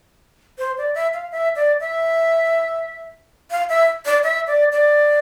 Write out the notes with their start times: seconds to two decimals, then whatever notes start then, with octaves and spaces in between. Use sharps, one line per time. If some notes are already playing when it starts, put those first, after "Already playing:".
0.58 C5
0.78 D5
0.95 E5
1.14 F5
1.32 E5
1.56 D5
1.80 E5
3.51 F5
3.69 E5
4.06 D5
4.23 E5
4.47 D5
4.72 D5